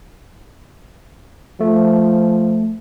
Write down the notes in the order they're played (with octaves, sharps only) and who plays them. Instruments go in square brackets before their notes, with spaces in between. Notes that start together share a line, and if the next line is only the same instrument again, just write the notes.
[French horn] F3 [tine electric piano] A3